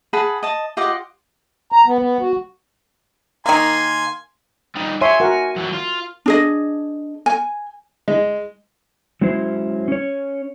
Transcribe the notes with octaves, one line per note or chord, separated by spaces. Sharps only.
G#4 F#5 A5 B5
D#5 A5
F4 G4 D#5 F#5
A#5
B3
B3
F#4
D#3 A#3 G#5 C6
G3 D#4
C#5 E5 G#5 C6
F#4 A#4 F#5
F#2 E3
F4
D4 G#4 D#5
G#5
G#3
F#3 G#3 C#4 E4 C5
C#4 C#5